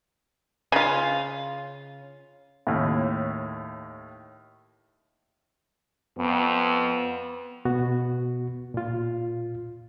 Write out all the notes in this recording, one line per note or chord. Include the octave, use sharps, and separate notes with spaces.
C#3 F4
D#2 A2
F2 B3
B2 B3 F#4
A#2 F4